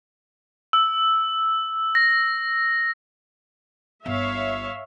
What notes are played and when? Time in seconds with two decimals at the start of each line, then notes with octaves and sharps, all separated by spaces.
0.73 E6
1.95 A#6
4.06 G1 C#5 E5 F5